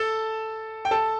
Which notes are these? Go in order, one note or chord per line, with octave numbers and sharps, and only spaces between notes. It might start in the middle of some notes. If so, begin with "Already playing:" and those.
Already playing: A4 A5
G5
A4 A5